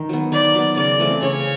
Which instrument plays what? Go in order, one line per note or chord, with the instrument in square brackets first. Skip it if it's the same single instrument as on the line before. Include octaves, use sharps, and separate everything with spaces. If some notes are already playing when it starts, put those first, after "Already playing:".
Already playing: [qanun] D#3
F#3 B3
[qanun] D#3 [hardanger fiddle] D5
[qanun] F#3 B3
[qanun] C#3 [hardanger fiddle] D5
[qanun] E3 A3 C4
[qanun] C#3 [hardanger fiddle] C#5